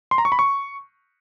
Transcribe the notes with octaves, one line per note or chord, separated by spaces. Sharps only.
C6
A#5
C#6
B5
C#6